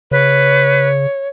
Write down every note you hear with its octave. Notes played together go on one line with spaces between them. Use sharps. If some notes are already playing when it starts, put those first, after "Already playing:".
C#3 B4 C#5